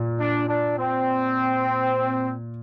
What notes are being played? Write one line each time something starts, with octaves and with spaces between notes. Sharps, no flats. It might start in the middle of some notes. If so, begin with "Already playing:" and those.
Already playing: A#2
D4
D4
C4